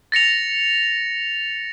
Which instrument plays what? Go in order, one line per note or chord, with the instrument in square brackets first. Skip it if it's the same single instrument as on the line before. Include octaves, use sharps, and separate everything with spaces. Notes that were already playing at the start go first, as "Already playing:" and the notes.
[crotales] A6 A#6 C#7 F7